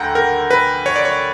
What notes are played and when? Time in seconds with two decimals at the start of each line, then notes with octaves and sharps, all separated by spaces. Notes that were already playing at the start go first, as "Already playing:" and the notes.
Already playing: D2 D3 F#5 G5 A#5
0.15 A#4
0.51 B4
0.86 C#5
0.96 D5
1.05 C#5